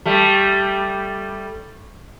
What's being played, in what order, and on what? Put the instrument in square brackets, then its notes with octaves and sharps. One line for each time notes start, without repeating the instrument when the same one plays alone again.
[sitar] G3 A3